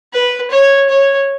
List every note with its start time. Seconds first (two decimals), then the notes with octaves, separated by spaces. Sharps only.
0.13 B4
0.51 C#5
0.89 C#5